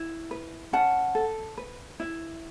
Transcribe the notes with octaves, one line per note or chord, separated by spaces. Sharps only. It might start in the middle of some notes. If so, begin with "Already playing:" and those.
Already playing: E4
B4
C#4 F#5 A5
A4
B4
E4